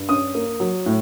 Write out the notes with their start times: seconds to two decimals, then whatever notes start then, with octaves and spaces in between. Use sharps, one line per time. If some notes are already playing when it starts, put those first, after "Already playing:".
Already playing: G2
0.09 C#4 D#6
0.35 A#3
0.60 F#3
0.86 A2